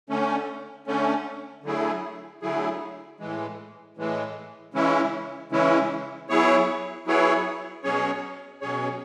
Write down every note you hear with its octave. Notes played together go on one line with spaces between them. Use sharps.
D3 A3 C#4
D3 A3 C#4
D3 F#3 A3 E4 G#4
D3 F#3 A3 E4 G#4
A2 E3 G#3
A2 E3 G#3
C#3 E3 G#3 C#4 E4
C#3 E3 G#3 C#4 E4
F#3 B3 E4 G#4 C#5
F#3 B3 E4 G#4 C#5
B2 F#3 C#4 G#4 C#5
B2 F#3 C#4 G#4 C#5